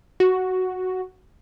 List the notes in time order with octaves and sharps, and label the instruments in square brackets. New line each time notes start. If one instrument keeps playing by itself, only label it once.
[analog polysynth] F#4